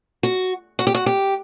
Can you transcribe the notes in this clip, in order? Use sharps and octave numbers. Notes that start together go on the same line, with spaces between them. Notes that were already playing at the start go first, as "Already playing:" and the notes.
F#4
F#4
G4
F#4
G4